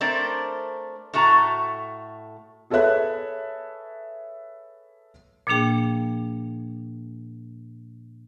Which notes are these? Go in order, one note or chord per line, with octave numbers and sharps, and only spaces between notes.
A3 C4 D4 A#4 C5 D5
A2 A3 F#4 A5 A#5
G#4 A4 B4 C#5 E5 F#6
A#2 F3 A#3 D4 G#4 G5